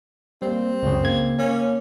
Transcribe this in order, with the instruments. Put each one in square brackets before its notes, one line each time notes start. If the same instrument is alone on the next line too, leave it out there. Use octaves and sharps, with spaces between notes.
[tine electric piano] G3 A#3 [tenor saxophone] C4
[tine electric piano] C#2 F#2 C#3
C#3 A#3 G#6
[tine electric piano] A#3 [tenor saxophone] C#4